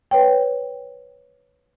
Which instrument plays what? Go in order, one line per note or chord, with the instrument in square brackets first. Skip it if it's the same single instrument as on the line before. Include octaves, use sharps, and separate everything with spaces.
[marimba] B4 C#5 G5